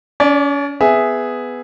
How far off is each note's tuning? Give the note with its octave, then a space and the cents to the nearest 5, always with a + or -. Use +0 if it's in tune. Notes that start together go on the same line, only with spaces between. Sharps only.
C#4 +35 D5 -5
B3 +10 G#4 +0 E5 +0